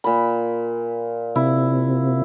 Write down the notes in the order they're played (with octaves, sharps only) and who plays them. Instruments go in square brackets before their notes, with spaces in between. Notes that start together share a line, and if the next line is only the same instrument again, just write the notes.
[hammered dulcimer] A#2 B5
[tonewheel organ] C3 [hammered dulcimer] E4